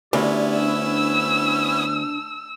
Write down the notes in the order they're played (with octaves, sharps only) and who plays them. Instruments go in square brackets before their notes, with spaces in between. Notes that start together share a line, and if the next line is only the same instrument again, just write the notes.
[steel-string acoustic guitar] D2 [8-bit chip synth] B3 C#4 E4 [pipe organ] G4 D5
[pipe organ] D4 [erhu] E6